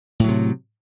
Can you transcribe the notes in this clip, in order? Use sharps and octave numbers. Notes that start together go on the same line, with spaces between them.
A2 C3 F#3